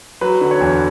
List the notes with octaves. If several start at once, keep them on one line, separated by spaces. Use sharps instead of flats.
F#3 B4
D3
C#5
E2